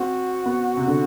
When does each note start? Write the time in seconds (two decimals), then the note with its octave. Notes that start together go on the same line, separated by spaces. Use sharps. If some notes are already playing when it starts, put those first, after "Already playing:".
Already playing: C4 F#4
0.46 B3
0.77 C3
0.88 D3